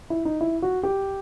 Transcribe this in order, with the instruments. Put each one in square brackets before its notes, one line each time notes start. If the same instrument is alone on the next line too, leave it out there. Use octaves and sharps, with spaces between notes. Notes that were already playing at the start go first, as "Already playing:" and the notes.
[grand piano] E4
D#4
E4
F#4
G4